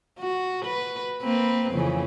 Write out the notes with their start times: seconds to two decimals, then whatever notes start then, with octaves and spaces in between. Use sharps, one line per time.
0.19 F#4
0.66 B4
1.23 A#3 C4 B4
1.71 F2 C#3 E3